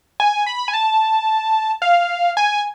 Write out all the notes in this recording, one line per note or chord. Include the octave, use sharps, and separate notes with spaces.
G#5
B5
G#5
A5
F5
G#5